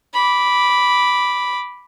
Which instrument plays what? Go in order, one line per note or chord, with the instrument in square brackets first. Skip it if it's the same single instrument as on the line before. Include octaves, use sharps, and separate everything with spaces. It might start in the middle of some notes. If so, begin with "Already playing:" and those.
[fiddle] B5 D6